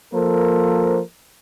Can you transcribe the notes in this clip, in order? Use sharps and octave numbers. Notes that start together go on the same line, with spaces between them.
F3 A#3 A4 A#4 C5